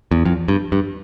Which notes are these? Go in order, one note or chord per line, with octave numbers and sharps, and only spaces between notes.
E2
F2
G2
G2